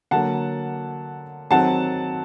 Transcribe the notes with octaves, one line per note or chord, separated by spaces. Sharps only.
D3 F#3 A#3 F#5 A5
D#3 F#3 C4 F#5 A5